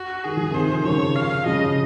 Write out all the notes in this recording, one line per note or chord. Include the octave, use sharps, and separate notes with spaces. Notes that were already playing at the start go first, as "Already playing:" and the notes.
Already playing: F#4
D#3 G#4
F3
C3 D#3 C5
D#3
C#3 F3 C#5
F5
C#3 F3 D#5